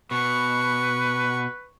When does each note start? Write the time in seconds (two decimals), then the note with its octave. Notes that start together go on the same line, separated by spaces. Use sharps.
0.11 B2 B4 C#6